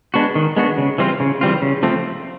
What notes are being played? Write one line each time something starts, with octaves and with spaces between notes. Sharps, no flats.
G#3 B3 D4 F#4
D#3
G#3 B3 D4 F#4
C#3
E3 G3 C4 F4
C#3
E3 G3 C4 F4
C#3
F3 A3 C4